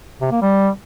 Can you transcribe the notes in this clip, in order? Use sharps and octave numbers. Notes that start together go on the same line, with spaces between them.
C3
A#3
G3